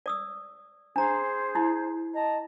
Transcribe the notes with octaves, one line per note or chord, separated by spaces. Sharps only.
D5 D#6 E6
D4 G#4 C5 A#5
D#4 E4
D#5 A5 A#5